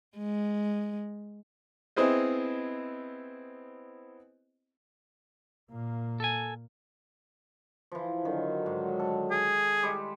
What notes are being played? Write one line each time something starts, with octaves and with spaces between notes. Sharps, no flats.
G#3
B3 C4 E4 G#4 C5 D#5
A#2 A#3
A4 G#5
E3 F3
D3 D#3 F#3
G#2
A4
G#4
G3 G#3 G4